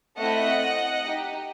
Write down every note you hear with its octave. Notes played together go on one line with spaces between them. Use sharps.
A3 C4 E4 A4 D#5 F#5
D#4 G4